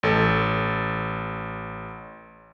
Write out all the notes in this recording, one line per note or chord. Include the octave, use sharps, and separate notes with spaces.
A1 A4